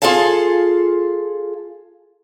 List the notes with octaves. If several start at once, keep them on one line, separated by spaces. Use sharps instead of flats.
F4 G#4 A4 F5 A5